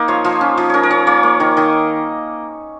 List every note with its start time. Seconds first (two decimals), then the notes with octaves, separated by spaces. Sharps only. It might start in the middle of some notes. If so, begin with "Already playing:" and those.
Already playing: A#3 D#4
0.08 F3 C#5
0.25 F3
0.41 C#4
0.58 F3
0.70 C#4 A#4 C#5
0.83 A#4
0.91 C#4 C#5
1.07 A#3 C#5
1.23 A#3
1.40 D#3 A#4
1.57 D#3 D#5